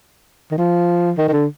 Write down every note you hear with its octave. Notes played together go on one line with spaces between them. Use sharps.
D#3
F3
D#3
D#3
D3